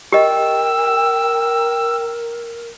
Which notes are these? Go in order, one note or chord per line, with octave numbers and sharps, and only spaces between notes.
G4 A#4 D#5 G5 E6